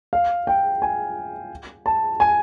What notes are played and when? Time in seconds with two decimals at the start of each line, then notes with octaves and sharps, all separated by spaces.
0.13 F5
0.47 G5
0.82 G#5
1.86 A5
2.20 G#5